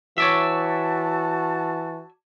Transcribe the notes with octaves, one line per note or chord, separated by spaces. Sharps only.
E3 F#4 C#5 D5 E5 A5